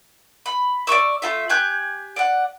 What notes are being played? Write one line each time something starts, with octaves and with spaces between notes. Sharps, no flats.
B5
D5 D#5 C#6 E6
A3 F4 E5
G4 G#5 F#6 G6
D5 F#5